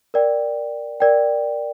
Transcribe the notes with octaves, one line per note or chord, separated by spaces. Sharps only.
A#4 D5 G5
A#4 D5 G5